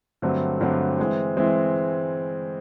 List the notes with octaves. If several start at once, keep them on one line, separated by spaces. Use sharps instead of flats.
G2 D3 F#3 A3 C4
G2 D3 F#3 A3 C4
E3 G#3 C4
E3 G#3 C4